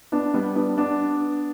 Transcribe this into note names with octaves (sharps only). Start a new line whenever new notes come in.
B3 D4
G3 B3
B3 D4
B3 D4